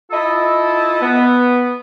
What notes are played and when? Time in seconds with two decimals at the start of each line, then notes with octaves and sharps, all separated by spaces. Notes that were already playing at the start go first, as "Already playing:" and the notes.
0.11 E4 F4 A4 D#5 A5
1.02 B3